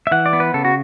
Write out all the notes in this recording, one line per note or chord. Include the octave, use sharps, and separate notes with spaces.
E5
E3 F#5
D5
B3
B4
C#3 A4
F#4